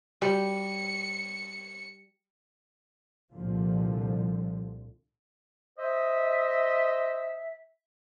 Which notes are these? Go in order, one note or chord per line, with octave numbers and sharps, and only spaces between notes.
G3 C#7
C2 A#2 D3 F3
C5 D#5 E5